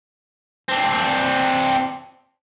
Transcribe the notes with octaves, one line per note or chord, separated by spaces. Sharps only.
C4 D4